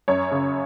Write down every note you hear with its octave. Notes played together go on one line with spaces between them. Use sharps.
F#2 C#5
C#3